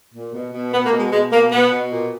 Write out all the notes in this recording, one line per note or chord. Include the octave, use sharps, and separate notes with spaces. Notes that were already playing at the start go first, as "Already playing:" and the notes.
A#2
B2
B2
B2 B3
A#3
B2
G#3
B2 G#3
B2 A#3
B2 B3
B2
A#2